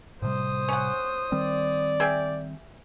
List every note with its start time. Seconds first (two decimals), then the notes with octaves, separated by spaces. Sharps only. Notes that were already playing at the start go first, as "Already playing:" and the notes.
0.22 A2 C3 G3 C5 D#6
0.68 C#4 F#5
1.32 D#3 G3 C4 D5
2.00 G#4 E5 G5